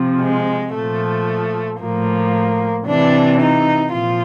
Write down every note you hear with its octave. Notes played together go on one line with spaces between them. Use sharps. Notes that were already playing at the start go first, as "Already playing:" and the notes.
Already playing: C3 F3
G#3
A#2 F3 A3
A2 F3 A#3
C3 E3 D4
D#4
A#2 F3 F4